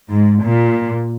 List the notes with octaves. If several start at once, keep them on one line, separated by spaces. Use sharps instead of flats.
G#2
A#2